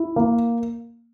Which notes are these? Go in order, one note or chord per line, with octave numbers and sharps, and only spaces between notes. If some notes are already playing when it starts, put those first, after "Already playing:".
Already playing: E4
A#3